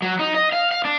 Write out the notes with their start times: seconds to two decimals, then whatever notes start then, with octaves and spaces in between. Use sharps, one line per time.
0.02 F#3
0.19 D#4
0.35 D#5
0.52 F5
0.71 F5
0.85 D4